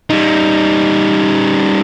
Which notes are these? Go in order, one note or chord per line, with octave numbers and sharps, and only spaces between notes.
G3 D#4